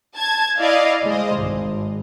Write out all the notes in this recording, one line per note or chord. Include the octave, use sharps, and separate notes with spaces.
A5 G#6
E4 D5 D#5 F5
G#3 C5 D#5
G#1